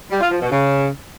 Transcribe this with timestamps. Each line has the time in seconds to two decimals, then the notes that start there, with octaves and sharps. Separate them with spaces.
0.11 G3
0.21 F4
0.31 F3
0.41 B2
0.51 C#3